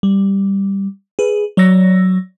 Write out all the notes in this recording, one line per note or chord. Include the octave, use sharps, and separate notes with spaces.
G3
G#4 B4
F#3 C#5 D5 E6 A#6